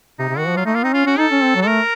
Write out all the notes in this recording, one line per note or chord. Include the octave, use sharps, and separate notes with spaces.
C3 D#4
C3
D#3 F#4
F3
F#3 F4
A3 D#4
A#3 F4
C4 D#4
C#4 F4
C#4 F#4
D#4 A4
C#4
C4
F#3
A4
A3 A#4